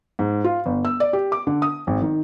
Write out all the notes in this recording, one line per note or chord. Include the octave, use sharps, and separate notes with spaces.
G#2
F4
G1
E6
D5
G4
D6
D3
D#6
G#1
D#3